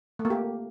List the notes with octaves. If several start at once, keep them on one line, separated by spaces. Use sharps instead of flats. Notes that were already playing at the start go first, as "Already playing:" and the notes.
A3
A#3
G4